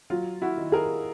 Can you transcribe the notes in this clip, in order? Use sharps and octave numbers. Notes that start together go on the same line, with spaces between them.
F#3 F4
E4 F#4
D#3
G#4 A#4